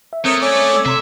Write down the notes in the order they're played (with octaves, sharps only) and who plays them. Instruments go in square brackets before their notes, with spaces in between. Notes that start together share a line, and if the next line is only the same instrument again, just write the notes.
[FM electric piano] E5
[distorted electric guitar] A3 [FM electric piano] C4 [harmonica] A#4 C#5 [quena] D#6
[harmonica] C#4 D5 [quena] C#5
[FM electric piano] A4 D6 E6
[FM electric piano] C3 A#5 C6 [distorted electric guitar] E5